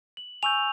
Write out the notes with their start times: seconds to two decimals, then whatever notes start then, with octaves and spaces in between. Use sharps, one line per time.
0.17 F#7
0.43 G#5 C#6 E6 G6 F7